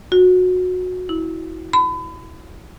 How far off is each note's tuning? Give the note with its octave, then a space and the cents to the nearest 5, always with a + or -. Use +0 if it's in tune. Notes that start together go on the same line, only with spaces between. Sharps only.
F#4 -20
E4 -30
B5 +35